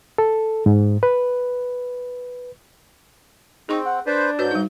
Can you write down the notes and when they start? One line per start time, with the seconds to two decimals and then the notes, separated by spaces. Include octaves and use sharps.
0.18 A4
0.66 G#2
1.03 B4
3.69 C4 D#4 G#4 C6 C#6
3.86 F#5
4.06 D4 B4 C5
4.39 G#2 F#4 B4 C#5 G6
4.51 G3 D#4